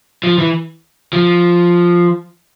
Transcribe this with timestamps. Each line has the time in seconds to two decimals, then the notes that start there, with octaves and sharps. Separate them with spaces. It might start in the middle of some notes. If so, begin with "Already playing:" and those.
0.24 F3
0.38 E3
1.13 F3